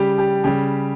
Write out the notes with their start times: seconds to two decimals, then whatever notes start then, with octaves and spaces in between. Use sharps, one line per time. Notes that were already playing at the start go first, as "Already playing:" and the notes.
Already playing: C#3 G3 G4
0.18 G4
0.44 C#3 G3 G4